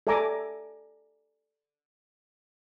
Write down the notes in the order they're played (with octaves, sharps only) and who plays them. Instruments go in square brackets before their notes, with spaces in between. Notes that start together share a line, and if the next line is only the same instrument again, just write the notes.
[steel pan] A4 D5 E5 G#5 A#5 D6